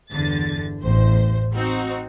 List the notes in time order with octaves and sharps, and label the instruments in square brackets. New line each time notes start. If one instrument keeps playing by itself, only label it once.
[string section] G1 E2 D3 A6
A1 E2 C5
C4 D#4 F#4